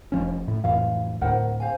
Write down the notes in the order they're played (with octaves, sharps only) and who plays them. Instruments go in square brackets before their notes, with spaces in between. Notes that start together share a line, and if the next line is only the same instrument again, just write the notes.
[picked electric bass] F1 F3 C#4
A2
[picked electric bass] F2 A2 E3 [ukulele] F5
[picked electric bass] D2 A2 [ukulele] A#4 C5 F#5
[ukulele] C5 F5 G#5